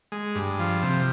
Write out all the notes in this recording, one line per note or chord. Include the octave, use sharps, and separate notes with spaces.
G#3
G2
F3
C3